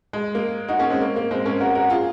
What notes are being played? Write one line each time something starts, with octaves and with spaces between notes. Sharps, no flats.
G#3
A#3
D#4 F#4
A#3 C#4
G#3 C4
A#3
A#3
G#3 C4
A#3 C#4
F#4 A#4
F#4 A#4
F4 G#4